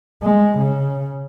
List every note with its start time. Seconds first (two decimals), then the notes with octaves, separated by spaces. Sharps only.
0.22 G#3
0.58 C#3